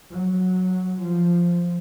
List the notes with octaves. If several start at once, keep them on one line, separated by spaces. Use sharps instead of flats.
F#3
F3